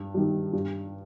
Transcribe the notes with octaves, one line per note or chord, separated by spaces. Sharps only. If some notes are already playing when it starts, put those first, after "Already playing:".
Already playing: G2
D#3 G3
G2